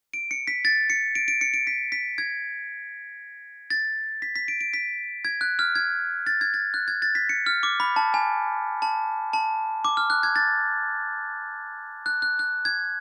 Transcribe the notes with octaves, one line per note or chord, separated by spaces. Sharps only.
D7
C#7
B6
A6
C#7
D7
D7
C#7
D7
B6
B6
G#6
A6
B6
B6
D7
D7
B6
G#6
F#6
F6
G#6
A6
G#6
A6
F#6
G#6
A6
B6
C#7
F6
D6
B5
A5
G#5
A5
A5
D6
F6
F#6
G#6
A6
F#6
F#6
F#6
G#6